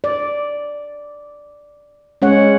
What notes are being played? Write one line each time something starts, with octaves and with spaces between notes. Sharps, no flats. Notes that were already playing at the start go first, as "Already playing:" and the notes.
D5
G#3 C#4 C#5 F#5